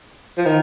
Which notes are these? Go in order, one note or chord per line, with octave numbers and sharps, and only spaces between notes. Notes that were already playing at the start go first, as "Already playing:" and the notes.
F3
D#3